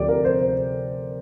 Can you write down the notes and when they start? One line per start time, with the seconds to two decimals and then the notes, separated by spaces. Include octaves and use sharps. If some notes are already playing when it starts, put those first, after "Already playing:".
Already playing: D2 C3 F3 G4 D5
0.09 A#4
0.24 C5
0.41 C5